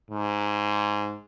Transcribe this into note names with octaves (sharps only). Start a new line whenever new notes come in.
G#2